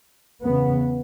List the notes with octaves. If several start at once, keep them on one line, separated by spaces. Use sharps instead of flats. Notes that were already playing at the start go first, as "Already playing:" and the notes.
E2 C#3 B3